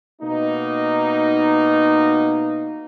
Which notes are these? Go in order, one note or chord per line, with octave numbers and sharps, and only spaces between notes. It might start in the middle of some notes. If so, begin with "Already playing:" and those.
B2 A#3 D#4